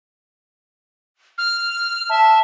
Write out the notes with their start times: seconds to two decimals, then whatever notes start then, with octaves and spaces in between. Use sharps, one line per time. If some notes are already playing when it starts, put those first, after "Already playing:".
1.38 F6
2.09 E5 A5